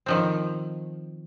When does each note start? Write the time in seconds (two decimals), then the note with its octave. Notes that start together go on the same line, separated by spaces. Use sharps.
0.06 D#3 F3 C4